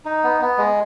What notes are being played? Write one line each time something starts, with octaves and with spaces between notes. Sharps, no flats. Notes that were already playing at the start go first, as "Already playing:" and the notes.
D#4
B3
B3
G#3